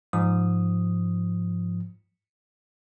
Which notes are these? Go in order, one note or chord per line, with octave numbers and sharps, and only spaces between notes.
G#2 F3 D#6